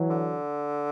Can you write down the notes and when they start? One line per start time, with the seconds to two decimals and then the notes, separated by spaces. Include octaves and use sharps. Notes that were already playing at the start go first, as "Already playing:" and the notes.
Already playing: E3 F#3
0.10 D3